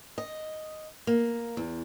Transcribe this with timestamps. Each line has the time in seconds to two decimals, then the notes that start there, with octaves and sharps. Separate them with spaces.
0.18 D#5
1.07 A#3
1.57 E2